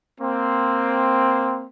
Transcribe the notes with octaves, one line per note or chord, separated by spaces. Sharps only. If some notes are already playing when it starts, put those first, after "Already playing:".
A#3 C4